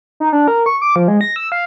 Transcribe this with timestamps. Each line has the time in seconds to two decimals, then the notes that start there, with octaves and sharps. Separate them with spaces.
0.20 D#4
0.33 D4
0.48 A#4
0.66 C#6
0.82 D6
0.96 F3
1.08 G#3
1.21 A#6
1.36 E6
1.52 F5